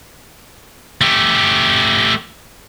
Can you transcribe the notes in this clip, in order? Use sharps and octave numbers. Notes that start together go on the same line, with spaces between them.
A3 G4